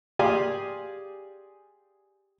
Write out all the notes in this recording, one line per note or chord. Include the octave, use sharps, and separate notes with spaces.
G4 G#4 D5 F5 G#5 C6